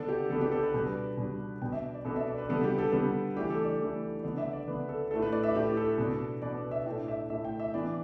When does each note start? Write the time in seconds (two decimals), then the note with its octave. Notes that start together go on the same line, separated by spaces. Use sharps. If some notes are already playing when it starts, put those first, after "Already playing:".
Already playing: D3 B3 D4 A4
0.08 G4
0.30 D3 B3 D4 A4
0.41 G4
0.52 A4
0.63 B4
0.74 B2 G3 D4 B4
1.17 B2 G3 D4
1.62 B2 B3 D4 G5
1.72 E5
1.94 D5
2.05 B2 B3 D4 A4
2.16 E5
2.27 D5
2.38 B4
2.49 D3 G3 B3 D4 A4
2.64 G4
2.78 A4
2.92 D3 G3 B3 D4 A4
3.36 E3 A3 D4 G4
3.50 A4
3.65 D5
3.80 E3 A3 D4
4.23 D3 B3 D4 D5
4.38 E5
4.52 D5
4.68 D3 B3 D4 B4
4.89 A4
5.11 D4 A4
5.14 A2 A3
5.22 B4
5.32 D5
5.43 E5
5.55 A2 A3 D4 G4
5.77 A4
5.98 B2 B3 D4
6.42 B2 B3 D4 D5
6.57 B4
6.71 E5
6.86 A2 A3 D4 G5
7.08 E5
7.30 A2 A3 D4 E5
7.45 G5
7.60 E5
7.74 E3 B3 D4 D5